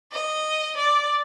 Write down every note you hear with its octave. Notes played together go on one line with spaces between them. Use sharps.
D#5
D5